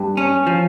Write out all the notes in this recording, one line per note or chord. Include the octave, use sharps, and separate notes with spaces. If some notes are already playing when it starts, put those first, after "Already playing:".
Already playing: G2
C#4
F3